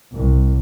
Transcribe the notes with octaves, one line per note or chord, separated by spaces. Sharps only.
C2